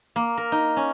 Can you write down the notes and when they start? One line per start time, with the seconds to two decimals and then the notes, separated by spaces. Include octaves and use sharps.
0.16 A#3
0.38 A#4
0.52 D#4
0.77 C#4